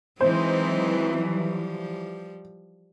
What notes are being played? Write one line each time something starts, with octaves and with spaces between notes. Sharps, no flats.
E3 F#3 G#3 C4 D#4 C5
F3 G3